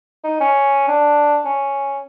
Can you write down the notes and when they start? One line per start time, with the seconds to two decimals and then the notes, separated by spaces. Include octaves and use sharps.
0.24 D#4
0.40 C#4
0.88 D4
1.45 C#4